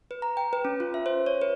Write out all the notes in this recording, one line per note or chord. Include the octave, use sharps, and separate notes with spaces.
B4
A#5
G5
B4
C#4
F4
E5
C5
C#5
B4